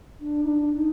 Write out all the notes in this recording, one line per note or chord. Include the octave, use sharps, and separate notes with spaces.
D4
D#4
D4
D#4